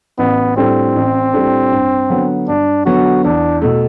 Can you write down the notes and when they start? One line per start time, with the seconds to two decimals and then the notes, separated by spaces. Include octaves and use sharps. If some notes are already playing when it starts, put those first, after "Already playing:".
0.19 A1 B3
0.57 A2 G3 C4 D4 A4
0.96 A1
1.33 A2 G3 D4 A4
1.72 G2
2.10 D3 F#3 B3
2.48 G2 D4
2.85 D3 F#3 B3 F#4
3.24 E2 D4
3.62 B2 A3